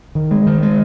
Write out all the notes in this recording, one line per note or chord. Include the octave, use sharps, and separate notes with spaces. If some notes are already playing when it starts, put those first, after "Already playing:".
D#3
G#3
D#3
G#3